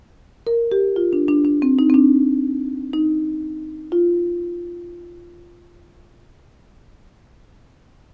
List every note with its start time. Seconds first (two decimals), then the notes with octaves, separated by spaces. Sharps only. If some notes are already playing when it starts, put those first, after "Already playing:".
0.47 A#4
0.72 G4
0.96 F4
1.13 D4
1.28 D4
1.45 D4
1.62 C4
1.79 D#4
1.90 C4
1.94 D4
2.93 D#4
3.92 F4